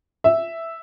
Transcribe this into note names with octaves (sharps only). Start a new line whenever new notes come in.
E5